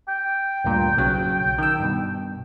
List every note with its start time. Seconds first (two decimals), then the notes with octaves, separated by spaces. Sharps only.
0.08 G5
0.65 D2 G2 A#2
0.97 B1 C#3 F#3
1.58 D#3 E6
1.79 G2 B2